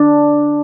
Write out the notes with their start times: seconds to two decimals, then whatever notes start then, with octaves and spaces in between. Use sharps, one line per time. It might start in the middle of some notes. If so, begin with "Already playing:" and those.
Already playing: D4